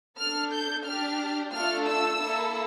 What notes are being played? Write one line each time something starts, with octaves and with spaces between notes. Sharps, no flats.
D4 A4 F6
G6
D4 G4 F6
A3 D4 F4 A4 F6
E6
A#3 E4 A4